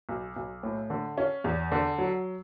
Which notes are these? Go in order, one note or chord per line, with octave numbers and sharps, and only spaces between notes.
B1
B1
A2
D3
C#4
E2
D3
F#3